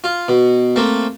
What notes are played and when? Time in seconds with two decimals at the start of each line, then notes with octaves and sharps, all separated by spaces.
0.04 F4
0.28 B2
0.76 A3 A#3 C4